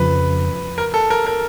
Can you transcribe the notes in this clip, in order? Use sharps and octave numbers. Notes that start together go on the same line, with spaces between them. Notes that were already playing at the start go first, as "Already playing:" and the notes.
Already playing: F2 C#3 F3 B4
A#4
A4
A#4
A#4